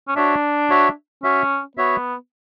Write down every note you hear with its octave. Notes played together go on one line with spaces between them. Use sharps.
C#4
D4 F#4 C#5 E5
F#4 C#5 E5
C#4 F#4 C#5 E5
B3 F#4 C#5 E5